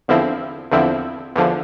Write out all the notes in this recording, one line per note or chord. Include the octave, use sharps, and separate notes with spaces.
E2 D3 F3 C4 E4
E2 D3 F3 C4 E4
E2 D3 F3